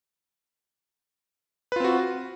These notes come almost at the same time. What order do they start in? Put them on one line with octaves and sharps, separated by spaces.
B4 F4 C4 F#4